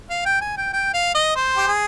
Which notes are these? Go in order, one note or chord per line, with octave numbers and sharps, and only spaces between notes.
F5
G5
G#5
G5
G5
F5
D#5
C5
G4
G#4